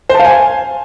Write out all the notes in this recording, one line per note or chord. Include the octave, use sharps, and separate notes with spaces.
C5
A5
F5
G#5